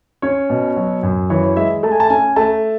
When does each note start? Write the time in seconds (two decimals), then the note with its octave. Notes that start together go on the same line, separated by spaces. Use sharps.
0.22 C#4 C#5
0.50 B2
0.76 F#3
1.03 F#2
1.30 E3 C#5
1.43 C#5
1.56 G#3 E5
1.83 A3 A5
1.92 G#5
2.00 A5
2.10 C#4 G#5
2.36 A3 A5